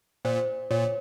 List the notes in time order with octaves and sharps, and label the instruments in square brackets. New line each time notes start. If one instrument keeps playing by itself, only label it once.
[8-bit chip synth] A#2 [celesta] C5
[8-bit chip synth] A#2 [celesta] C#5